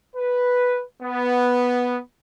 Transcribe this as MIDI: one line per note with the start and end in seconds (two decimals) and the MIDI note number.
0.16 0.84 71
1.03 2.00 59